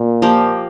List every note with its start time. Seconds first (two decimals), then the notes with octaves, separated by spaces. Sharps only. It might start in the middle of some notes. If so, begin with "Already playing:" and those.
Already playing: A#2
0.22 F3 A#3 G4